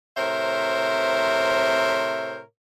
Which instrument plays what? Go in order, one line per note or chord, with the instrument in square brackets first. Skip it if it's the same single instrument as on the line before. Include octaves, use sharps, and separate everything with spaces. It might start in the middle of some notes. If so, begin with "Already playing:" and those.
[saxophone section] A2 C3 A#4 C5 C#5 E5